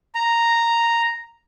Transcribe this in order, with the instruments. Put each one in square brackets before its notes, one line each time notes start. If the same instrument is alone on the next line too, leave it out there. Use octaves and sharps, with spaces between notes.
[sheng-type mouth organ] A#5